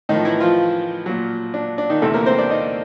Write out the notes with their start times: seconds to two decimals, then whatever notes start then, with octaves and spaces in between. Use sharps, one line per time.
0.09 A2 D#3 F3 D#4
0.25 E3 E4
0.40 F3 F4
1.06 A#2 F#3
1.54 D4
1.78 D4
1.90 D#3 D#4
2.02 E2 C3 E3 A3 A4
2.14 A#3 A#4
2.26 C4 C5
2.38 D4 D5
2.50 D#4 D#5